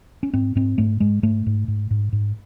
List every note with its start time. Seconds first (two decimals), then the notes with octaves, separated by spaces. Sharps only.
0.23 C#4
0.34 G#2 C4
0.55 G#2 C4
0.78 G#2 A3
1.00 G#2 G#3
1.23 G#2 A3
1.46 G#2
1.68 G#2
1.91 G#2
2.13 G#2